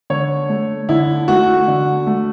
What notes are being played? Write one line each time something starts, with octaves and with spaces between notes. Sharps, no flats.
D3 C#5
A3
D3 E4
A3 F#4
D3
A3